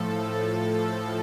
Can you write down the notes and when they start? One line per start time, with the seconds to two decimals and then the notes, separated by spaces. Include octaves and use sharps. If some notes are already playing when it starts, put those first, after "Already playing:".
Already playing: A2 F3 A4